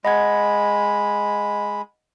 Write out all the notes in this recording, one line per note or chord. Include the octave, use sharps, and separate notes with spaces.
G#3 D#5 F#5 B5 G#6